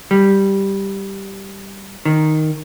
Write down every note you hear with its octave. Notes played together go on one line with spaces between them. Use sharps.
G3
D#3